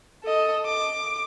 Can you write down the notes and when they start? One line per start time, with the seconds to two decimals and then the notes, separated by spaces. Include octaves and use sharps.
0.23 A4 D#5
0.66 D6